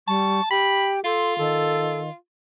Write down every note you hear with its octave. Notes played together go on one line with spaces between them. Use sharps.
G3 A5 C#6
G4 G5 B5
F4 A4 C6
D#3 A4